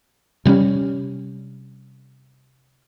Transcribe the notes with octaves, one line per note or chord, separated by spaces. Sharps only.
C3 G3 A3 C#4